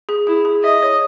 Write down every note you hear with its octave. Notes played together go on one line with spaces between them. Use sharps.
G#4
E4 G#4
G#4
D#5 E5
C#5